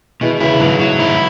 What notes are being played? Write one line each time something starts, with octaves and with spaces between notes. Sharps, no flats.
B2 E3 G#3
C#3 E3 E4
G#2 B2 F#3
A2 F#3
G#2 E4